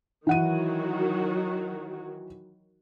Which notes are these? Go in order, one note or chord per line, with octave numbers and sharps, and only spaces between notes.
D#3 E3 F#3 F#4 F#5 D#7